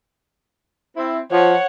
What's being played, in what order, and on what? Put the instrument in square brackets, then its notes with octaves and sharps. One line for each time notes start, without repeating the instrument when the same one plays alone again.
[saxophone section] C4 E4
[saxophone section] F3 [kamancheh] C#5 F#5